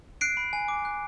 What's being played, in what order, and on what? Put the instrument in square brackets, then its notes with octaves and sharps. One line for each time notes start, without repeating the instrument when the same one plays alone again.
[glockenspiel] F#6 C7 D7
B5
G#5
D6
F#6